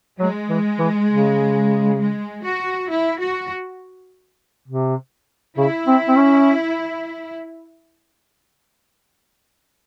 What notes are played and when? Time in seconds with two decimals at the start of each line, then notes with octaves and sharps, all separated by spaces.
0.19 F#3 G#3
0.49 E3
0.79 E3
1.09 C#3
1.98 G#3
2.44 F#4
2.88 E4
3.18 F#4
4.68 C3
5.57 C#3 E4
5.87 C4
6.08 C4
6.17 C#4